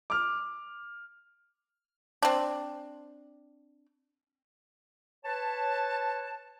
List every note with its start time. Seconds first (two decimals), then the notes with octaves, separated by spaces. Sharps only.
0.10 D6 F6
2.23 C4 D4
5.25 B4 C#5 A5